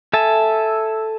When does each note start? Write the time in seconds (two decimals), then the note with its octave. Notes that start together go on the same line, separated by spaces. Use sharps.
0.13 A4 E5 G#5 A5